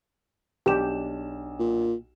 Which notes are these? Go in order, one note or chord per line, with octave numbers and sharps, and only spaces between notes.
B1 D4 G4 E7
A#2